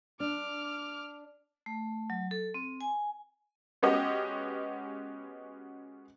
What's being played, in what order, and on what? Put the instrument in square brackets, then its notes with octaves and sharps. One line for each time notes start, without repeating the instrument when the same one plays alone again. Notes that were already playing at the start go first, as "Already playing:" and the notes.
[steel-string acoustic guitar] D4 [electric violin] D6 F6
[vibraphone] A3
F#3
A4
C4
G#5
[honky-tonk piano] G#3 B3 C#4 F#4 G4 D#5